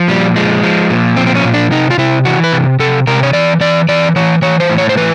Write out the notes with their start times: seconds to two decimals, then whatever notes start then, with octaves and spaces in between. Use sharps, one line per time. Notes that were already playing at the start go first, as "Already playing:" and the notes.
Already playing: F3
0.08 A#2 G3
0.36 F3 G#3
0.63 F3
0.90 A#2
1.16 F3 C4
1.27 C4
1.35 C#4
1.45 A#2
1.54 D4
1.71 C3 D#4
1.91 F4
1.98 C3 E4
2.25 E3 F#4
2.44 B4
2.53 C3
2.79 C3 A4
3.07 C3 A#4
3.23 C#5
3.33 E3 D5
3.60 E3 D5
3.89 E3 D5
4.16 E3 C#5
4.42 E3 C#5
4.60 C5
4.70 A2
4.78 C#5
4.89 C5
4.97 E3 B4